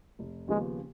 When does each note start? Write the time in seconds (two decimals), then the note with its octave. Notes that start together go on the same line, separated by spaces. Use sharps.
0.19 F1
0.48 D#2 C#3 F3 G#3 B3